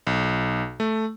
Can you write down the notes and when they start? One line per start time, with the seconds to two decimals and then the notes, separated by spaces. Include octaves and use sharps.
0.07 B1
0.80 A3